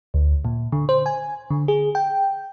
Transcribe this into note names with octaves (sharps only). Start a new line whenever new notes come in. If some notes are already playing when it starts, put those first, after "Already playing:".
D2
A#2
D3
C5
G#5
D3
G#4
G5